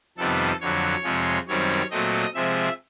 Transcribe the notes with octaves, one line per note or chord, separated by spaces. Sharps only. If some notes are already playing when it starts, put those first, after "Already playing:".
F2 C3 D#3 G3 B3 A4
F2 D3 F#3 C#5
F2 C3 F3 G#3
F#2 D#3 G3 C4 C#5
A#2 F#3 A3 C4 D#5
C3 F3 G#3 C4 E5